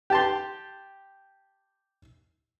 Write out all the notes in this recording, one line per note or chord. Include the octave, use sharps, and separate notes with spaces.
G4 A5 C6